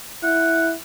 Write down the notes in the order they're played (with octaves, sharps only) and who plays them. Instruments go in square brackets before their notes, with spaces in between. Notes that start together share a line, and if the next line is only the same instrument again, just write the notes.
[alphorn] E4 [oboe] F#5